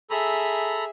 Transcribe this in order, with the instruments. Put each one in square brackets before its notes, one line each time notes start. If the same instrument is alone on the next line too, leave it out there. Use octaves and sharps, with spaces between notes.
[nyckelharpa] G#4 E5 [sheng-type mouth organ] A4 A#5 B5